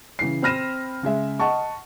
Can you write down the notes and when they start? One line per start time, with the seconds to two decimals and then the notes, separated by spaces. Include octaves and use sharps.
0.19 C#3 E3 C7
0.42 C4 B5 F6 A#6 D#7 E7
1.03 C#3 G#3 E5
1.40 D#5 F#5 A5 C#6